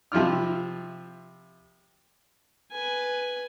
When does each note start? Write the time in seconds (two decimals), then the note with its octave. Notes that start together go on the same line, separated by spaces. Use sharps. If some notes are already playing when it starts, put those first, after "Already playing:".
0.12 C3 F3 E4 F4 F6
2.72 B4 G#5